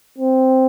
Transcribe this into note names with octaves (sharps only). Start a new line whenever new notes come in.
C4